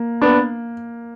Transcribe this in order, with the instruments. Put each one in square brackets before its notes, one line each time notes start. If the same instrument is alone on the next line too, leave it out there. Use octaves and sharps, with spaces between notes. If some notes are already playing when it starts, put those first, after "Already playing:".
Already playing: [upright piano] A#3
[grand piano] B3 D4